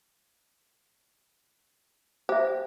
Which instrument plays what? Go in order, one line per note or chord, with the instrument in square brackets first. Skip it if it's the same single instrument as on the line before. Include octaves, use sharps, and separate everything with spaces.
[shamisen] G4 [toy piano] C5 E5